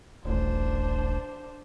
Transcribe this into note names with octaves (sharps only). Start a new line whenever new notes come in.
D#1 A1 D4 C5